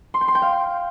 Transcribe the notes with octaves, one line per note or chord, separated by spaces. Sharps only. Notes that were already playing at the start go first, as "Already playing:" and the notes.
C6
G5
C6
G5
F5